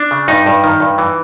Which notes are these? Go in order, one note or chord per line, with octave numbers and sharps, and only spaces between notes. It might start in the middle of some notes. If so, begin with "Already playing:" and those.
Already playing: D4
C#3
G2 D#4
G2
D#3
G2
E3